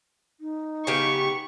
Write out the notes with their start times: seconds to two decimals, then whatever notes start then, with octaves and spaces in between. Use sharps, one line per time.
0.41 D#4
0.87 C#3 B3 G4 C#6